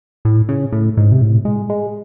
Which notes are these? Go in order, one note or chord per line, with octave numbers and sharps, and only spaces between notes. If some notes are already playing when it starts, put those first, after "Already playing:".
A2
C#3
A2
G#2
C3
A2
G#3
G#3